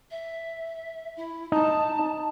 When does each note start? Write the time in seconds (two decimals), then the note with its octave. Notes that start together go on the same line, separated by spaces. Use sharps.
0.10 E5
1.16 E4
1.52 D#4 A5